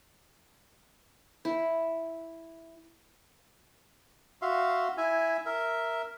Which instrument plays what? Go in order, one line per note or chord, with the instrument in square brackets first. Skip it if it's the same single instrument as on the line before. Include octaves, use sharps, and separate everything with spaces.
[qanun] E4
[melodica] F#4 E5 F5 C6
E4 E5 G#5
A#4 E5